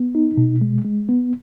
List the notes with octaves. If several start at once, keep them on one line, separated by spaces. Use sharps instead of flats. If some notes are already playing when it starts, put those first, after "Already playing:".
Already playing: B3
D#4
B2
G#3
G#3
B3